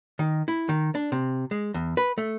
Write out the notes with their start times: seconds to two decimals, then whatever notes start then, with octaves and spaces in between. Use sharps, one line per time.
0.19 D#3
0.48 E4
0.69 D#3
0.95 D4
1.12 C3
1.51 G#3
1.74 E2
1.97 B4
2.18 A3